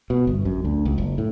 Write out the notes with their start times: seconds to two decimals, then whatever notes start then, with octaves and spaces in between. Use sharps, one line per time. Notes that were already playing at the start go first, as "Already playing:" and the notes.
0.10 B2
0.27 G1
0.45 F#2
0.65 D2
0.85 C#2
0.98 F#1
1.18 A2